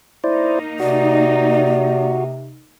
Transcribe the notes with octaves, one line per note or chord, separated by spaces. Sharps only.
A#3 D#4 E4 C5 D5
C3 F#4 D5